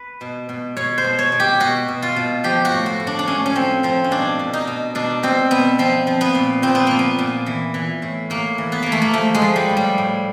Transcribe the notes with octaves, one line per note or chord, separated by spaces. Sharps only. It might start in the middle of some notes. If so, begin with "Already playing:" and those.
Already playing: B4
B2
B2
B2 C#5
C5
B2
C#5
B2
G4
B2 F#4
B2
F4
B2
F3 G4
F#4
A2
F#4
A2
D4
D4
A2 C#4
C#4
F3 C4
F3 C4
C#4
B2 D4
B2
D#4
B2
B2 D4
B2 C4
B2 B3
F3 C4
F3
B3
A#2
A#2 C4
B3
F3 A#3
B3
A#2
E3
E3
A2
A2 A#3
E3
B3
E3 A#3
A3
A#3
F3 A3
G#3
F3
G3
A2
G3
A2